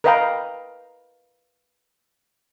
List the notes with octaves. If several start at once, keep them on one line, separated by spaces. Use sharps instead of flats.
A#4 B4 D#5 F5 G5 A#5